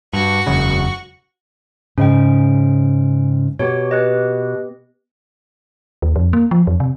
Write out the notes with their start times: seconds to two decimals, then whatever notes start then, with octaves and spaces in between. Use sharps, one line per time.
0.13 G2 F#4 C#6
0.47 E1 F#2 C#3
1.98 G#2 C#3 C#4 G5
3.59 B2 G4 C#5
3.91 G4 B4 D#5
6.02 D#2
6.16 F2
6.33 A#3
6.51 F3
6.67 F2
6.80 C3